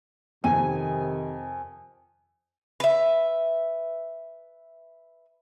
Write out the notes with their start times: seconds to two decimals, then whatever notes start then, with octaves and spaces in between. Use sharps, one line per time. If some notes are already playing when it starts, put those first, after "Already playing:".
0.44 F2 C3 D#3 G#5 D#7
2.80 B4 E5